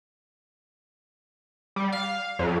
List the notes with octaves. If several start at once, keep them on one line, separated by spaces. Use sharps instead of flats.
G3
F5
F2